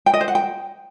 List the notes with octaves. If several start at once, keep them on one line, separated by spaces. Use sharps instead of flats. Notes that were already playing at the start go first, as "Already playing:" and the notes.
G5
D#5
C5
F#5
G5